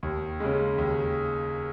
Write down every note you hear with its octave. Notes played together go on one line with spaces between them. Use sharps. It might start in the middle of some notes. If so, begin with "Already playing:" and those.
D#2
C#3 G#3
D#2